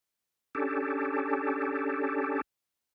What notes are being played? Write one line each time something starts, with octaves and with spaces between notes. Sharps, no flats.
C#4 D4 G4 A4